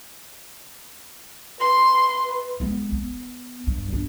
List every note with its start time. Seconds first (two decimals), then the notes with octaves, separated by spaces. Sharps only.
1.60 B4 C6
2.60 G#3 B3
2.92 B3
3.67 G2
3.93 D4